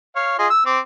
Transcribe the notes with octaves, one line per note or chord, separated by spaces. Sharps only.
C#5 F5
F4 G#4 D#5
E6
C4 D6